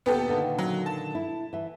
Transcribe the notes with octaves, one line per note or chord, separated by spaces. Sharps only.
D2 A#2 B3 G4 A4 B4
A#2 D3 D#3
F#3
A5
E4
E3 E5